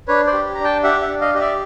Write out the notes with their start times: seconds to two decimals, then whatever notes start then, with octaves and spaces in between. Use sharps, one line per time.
0.08 D4 B4 C#5
0.27 C5 D5
0.33 G4
0.55 D4 A#5
0.64 G5 A5
0.83 G4 E5 F#5
1.02 E5 F#5
1.08 D4
1.21 D#5 F5
1.34 G4 D#5
1.40 D5 E5